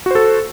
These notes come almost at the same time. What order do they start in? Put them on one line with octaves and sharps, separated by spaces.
F#4 C5 A4